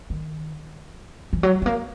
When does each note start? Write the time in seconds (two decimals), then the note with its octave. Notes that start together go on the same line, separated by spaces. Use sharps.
0.10 D#3
1.33 E3
1.43 F#3
1.62 G#3
1.66 A#3